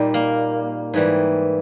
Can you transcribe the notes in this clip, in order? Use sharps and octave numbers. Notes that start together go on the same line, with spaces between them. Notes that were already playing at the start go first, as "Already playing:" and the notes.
Already playing: A#2 G3 D#4
A#3
G#2 E3 G3